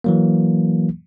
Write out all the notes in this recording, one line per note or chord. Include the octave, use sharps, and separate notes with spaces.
E3 F#3 A#3